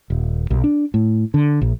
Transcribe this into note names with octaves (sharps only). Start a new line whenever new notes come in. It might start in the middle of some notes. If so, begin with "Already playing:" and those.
D#1
B1
D4
A2
D3
A#1